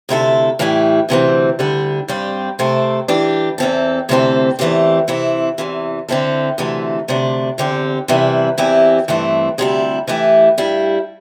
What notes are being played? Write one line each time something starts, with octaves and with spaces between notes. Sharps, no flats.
D2 C3 A3 E4 A4
A2 E3 G3 E4 G4
D2 C3 E3 C4
D2 D3 G3 D4
G2 G3 C4 G4
C3 A3 C4 A4
E3 G3 D4 G4
E2 E3 C4 A4
D2 C3 E3 C4 A4
E2 E3 A3 C4 G4
C3 E3 C4 E4
E2 C3 E3
D3 C4 E4 A4
D2 C3 E3 A3
D2 C3 A3 D4
E2 D3 C4 G4
E2 C3 E3 G3 E4
E2 E3 C4 E4 G4
G2 E3 A3 C4
D2 C3 G3 E4
E3 A3 E4 G4
G2 G3 E4